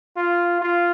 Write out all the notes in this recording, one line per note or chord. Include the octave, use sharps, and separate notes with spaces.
F4
F4